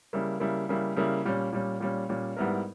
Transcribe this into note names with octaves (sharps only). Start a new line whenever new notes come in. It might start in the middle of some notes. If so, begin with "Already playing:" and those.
C#3 G3 A#3 E4
C#3 G3 A#3 E4
C#3 G3 A#3 E4
C#3 G3 A#3 E4
A#2 G3 C#4
A#2 G3 C#4
A#2 G3 C#4
A#2 G3 C#4
G#2 G3 B3 E4 A#4